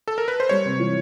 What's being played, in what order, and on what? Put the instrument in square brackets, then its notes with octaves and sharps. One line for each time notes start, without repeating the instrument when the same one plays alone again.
[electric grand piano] A4
A#4
B4
C5
[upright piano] G3 [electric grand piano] C#5
[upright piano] C3
E3